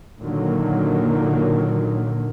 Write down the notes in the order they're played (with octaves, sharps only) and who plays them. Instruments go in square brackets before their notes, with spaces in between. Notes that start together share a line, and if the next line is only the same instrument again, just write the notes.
[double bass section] A#2 D3 D#3 F#3 A#3